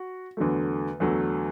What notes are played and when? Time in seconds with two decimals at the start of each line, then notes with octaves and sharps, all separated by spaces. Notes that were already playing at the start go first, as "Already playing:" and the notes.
Already playing: F#4
0.37 E2 D3 F#3 A3
1.00 E2 D3 F#3 A3